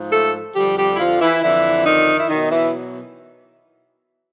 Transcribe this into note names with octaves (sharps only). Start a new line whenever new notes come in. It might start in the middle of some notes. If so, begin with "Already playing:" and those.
Already playing: G#2 F3
A3 A4
F2 D3 F3 G3 G4
G3 G4
E4
F3 F4
E3 E4
F2 D3 E3 F3 E4
D#3 D#4
E4
B2 D#3 F#3 D#4
E3 E4